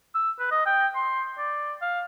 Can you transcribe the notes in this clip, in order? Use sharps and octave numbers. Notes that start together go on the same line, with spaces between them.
E6
B4
D#5
G5
C6
D5
F5